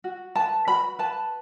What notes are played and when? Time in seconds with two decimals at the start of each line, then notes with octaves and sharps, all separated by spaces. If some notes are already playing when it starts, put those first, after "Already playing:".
0.04 F#4
0.35 B4 A5
0.67 F#4 B5
0.99 B4 A5